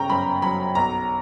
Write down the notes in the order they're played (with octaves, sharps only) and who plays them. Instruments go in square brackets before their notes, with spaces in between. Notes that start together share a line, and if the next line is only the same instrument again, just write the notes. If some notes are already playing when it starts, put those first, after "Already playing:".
Already playing: [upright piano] G1 C#3 G5 A#5 C#6
F#2 B5
F#3 B5
B1 A#5